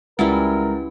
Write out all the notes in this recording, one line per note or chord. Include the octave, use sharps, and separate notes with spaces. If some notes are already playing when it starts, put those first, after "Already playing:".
C#2 G3 C#4 E4 F4 A#4 B4 G#5